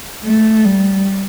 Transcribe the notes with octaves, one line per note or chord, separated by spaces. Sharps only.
A3
G3